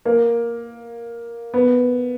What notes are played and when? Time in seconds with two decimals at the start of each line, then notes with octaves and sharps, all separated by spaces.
0.05 A#3
1.54 B3